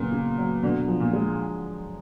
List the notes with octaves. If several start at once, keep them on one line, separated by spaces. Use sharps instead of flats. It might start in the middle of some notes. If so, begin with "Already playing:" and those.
Already playing: A#2 C#3 F#3 B3
C#3
F#3
B2 D3
F3
A#2
G#3